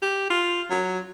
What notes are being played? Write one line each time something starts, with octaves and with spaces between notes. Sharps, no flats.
G4
F4
F#3